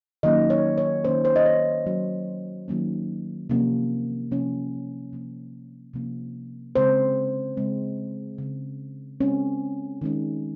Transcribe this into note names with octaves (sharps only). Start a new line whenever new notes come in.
D#3 F#3 A#3 C#4 D#5
C#5
C#5
D#3 F#3 A#3 C#4 C5
C5
D#5
C#5
D#3 F#3 A#3 C#4
D#3 F#3 A#3 C#4
C3 F3 A#3 C#4
C3 F3 A#3 C#4
C3 F3 A#3 C#4
C3 F3 A#3 C#4
C#3 G#3 C4 C5
C#3 G#3 C4
C#3 G#3 C4
C#3 G#3 C4 C#4
D#3 G#3 C#4